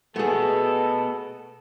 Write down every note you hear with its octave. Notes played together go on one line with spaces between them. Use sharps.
B2 A3 B3 G#4 A4